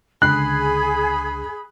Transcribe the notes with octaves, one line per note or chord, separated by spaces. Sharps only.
C#2 D3 G#4 B5 F#6 C7